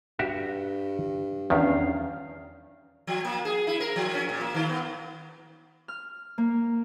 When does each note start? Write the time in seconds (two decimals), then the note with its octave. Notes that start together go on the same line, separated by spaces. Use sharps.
0.19 G2 F#4 G4 E5
1.50 E2 D#3 C#4 D4 F5
3.07 F3
3.25 A#3
3.45 G#4
3.67 E4
3.80 A#4
3.96 F3
4.15 C#4
4.29 A#2
4.41 A#3
4.54 D#3
4.69 B3
5.88 F6
6.38 A#3